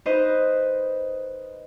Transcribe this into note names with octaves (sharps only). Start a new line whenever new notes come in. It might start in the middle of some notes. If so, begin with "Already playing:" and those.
D#4 B4 C5 D#5